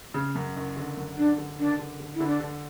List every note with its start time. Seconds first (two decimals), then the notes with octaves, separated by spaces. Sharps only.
0.14 C#3
0.35 F#2
0.56 F#1
0.76 D3
0.97 F#2
1.18 D3 D4
1.38 D3
1.58 F#1 D4
1.79 D3
2.00 D3
2.15 E4
2.20 D3
2.27 D4
2.40 D3